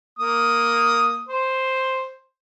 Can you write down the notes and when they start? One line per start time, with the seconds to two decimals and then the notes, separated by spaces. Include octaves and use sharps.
0.19 A#3 D#6
1.28 C5